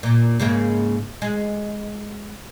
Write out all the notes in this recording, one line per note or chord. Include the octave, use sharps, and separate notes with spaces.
A#2
G#2 C#3 A#3
G#3